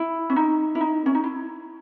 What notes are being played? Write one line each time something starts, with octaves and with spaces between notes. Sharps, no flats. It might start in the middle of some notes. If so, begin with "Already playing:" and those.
Already playing: E4
C#4
D#4
E4
D#4
C#4
D#4
E4